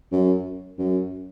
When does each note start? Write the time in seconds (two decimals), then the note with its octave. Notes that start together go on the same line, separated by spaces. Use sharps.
0.12 F#2
0.78 F#2